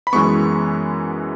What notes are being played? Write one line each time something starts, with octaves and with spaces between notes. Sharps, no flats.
B5
F#2 E3 G#3 B3 C#6